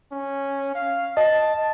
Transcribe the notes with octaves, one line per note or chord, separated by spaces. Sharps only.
C#4
F5
D#5 A5